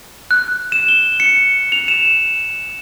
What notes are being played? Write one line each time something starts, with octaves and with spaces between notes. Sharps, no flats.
F#6
E7
G7
C#7
F7
E7